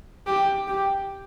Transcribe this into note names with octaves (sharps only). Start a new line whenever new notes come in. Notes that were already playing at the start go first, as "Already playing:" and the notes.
G4
G4